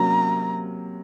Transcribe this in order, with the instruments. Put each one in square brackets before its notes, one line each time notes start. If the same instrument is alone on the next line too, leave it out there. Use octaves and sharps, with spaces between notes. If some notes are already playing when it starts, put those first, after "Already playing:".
Already playing: [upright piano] C3 F#3 A#3 C#4 [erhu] A#5